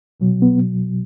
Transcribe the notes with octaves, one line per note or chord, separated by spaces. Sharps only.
C2 B2 F#3
B3